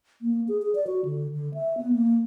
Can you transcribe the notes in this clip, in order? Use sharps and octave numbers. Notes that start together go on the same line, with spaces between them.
A#3
G#4
G#4
D5
F#4
D3
D3
E5
B3
A#3